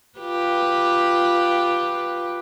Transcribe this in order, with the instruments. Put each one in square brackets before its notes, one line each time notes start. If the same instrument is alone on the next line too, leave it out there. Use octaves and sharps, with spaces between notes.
[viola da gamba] F4 G4 B4